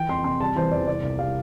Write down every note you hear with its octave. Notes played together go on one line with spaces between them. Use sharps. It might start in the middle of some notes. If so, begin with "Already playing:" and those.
Already playing: E3 G5
F2 C6
C3 C6
G3 A5
E3 C5
E2 D5
C2 D5
C2
G3 F5